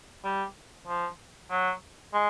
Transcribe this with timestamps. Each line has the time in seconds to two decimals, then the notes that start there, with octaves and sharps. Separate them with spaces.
0.24 G3
0.87 F3
1.51 F#3
2.14 G#3